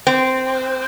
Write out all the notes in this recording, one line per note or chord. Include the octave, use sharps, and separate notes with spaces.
C4